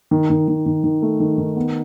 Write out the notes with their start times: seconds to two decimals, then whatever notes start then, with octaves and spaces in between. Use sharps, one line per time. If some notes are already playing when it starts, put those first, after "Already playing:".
0.11 D#3
0.30 D#3
0.48 D#3
0.66 D#3
0.84 D#3
1.02 A3
1.20 D#3
1.38 D#3
1.56 B3